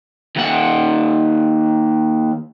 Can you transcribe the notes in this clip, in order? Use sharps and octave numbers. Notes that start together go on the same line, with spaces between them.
D#2 F#5